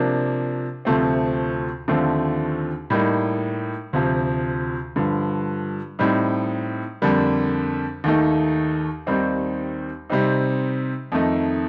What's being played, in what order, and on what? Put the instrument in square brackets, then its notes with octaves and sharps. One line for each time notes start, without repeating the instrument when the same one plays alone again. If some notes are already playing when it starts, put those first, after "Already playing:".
Already playing: [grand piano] C3 F3 A#3 D4
D2 C3 F3 A3 C4
D#2 D3 F3 A3 C4
A2 G3 A#3 D#4
D2 C3 F3
G2 D3 F3
A2 G3 C4 D#4
F2 D3 G3 A#3
D#2 D#3 A3 D#4
D#2 D#3 G3 C4 D#4
C3 G3 C4 D#4
F2 D#3 A3 D#4